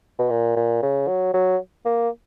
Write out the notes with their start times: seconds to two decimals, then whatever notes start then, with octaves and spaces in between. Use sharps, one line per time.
0.19 B2
0.30 A#2
0.56 A#2
0.82 C#3
1.08 F#3
1.34 F#3
1.86 A#3